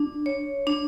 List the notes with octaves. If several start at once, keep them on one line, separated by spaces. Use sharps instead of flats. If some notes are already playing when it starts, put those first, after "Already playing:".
Already playing: D4
C#5
D4